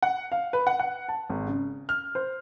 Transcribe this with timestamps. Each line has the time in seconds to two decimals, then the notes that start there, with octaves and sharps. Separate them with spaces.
0.02 F#5
0.32 F5
0.53 B4
0.67 F#5
0.79 F#5
1.08 A5
1.30 G#1
1.47 C#3
1.89 F6
2.15 C5